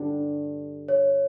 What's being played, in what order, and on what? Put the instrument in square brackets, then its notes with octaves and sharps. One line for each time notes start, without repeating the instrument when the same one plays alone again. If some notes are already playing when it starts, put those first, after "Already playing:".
Already playing: [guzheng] G2 D3 G3
[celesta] C#5